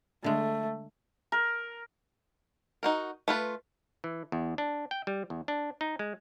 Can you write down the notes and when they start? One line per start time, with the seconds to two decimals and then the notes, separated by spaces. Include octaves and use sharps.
0.24 D3 G#3 A3
1.32 A#4
2.83 D#4 F#4 A#4
3.28 A3 F4 B4
4.04 E3
4.32 E2
4.58 D4
4.91 G5
5.07 G3
5.30 E2
5.48 D4
5.81 D#4
5.99 G#3